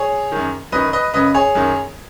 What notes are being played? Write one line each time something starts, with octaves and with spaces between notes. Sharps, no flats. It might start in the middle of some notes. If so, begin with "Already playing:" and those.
Already playing: G#4 C#5
F#2 D#3
F#2 D#3 B4 D#5
B4 D#5
F#2 C#3 B4 D#5
G#4 C#5
F#2 D#3